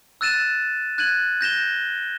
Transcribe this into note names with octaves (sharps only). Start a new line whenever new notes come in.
E6 F#6 A6 D#7 E7
F#6 G#6 D#7 F#7
G6 A#6 E7 G7